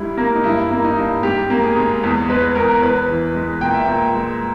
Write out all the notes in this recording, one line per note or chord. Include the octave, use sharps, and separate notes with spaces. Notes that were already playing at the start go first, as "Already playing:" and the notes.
Already playing: G#2 G3 E4
A#3
D#4
G2 E4
A#3
D#4
G2
G#2 G4
A#3
G#4
G#2
E2
G#3 B4
E2 A#4
E2 B4
E3
G#3
A#2 G5
E5
A#2 G5
G#3